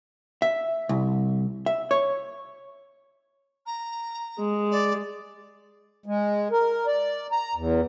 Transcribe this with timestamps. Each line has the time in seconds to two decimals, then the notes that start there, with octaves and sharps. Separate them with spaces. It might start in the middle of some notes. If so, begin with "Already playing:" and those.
0.42 E5
0.89 C2
1.66 E5
1.91 C#5
3.66 A#5
4.39 G#3
4.71 D5
6.06 G#3
6.51 A#4
6.87 D5
7.32 A#5
7.55 E2